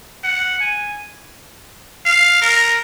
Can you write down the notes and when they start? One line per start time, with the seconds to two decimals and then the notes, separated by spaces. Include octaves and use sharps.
0.24 F#5
0.61 G#5
2.06 F5
2.42 A#4